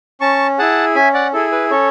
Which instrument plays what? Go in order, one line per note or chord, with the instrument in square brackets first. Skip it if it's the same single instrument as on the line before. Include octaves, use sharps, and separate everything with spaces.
[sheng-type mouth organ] C#4 A5 C#6
E4 G#4 F#5 A5
C#4 E5 G#5
D5 F#5
E4 G#4 A4
B4
C#4 A4 C#5